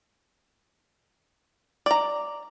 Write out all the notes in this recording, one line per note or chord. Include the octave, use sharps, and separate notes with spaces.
D5 A#5